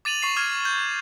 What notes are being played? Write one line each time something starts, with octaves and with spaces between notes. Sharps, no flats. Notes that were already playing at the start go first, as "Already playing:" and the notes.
D6 A6 D#7 F7 F#7
C#6 C7
D6 F6 G#6
G6